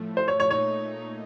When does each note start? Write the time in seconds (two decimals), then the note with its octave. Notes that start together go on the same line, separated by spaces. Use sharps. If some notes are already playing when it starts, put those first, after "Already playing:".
Already playing: A2 F3 A3
0.17 C5
0.28 C#5
0.40 C#5
0.50 A#2 A3 D#4 C#5